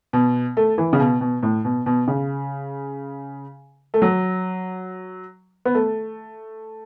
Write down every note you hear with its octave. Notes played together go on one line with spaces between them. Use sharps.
B2
A3
E3
C#3
B2
B2
A2
B2
B2
C#3
A3
F#3
B3
A3